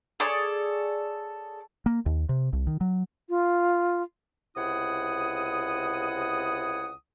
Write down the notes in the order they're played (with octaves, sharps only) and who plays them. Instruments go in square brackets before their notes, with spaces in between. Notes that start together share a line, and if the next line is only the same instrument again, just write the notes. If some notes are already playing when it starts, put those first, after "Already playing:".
[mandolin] G#4 A4 C#5 D5
[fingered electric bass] A#3
D#2
C3
C2
D#3
F#3
[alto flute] F4
[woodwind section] C#2 C3 E4 F#5 D#6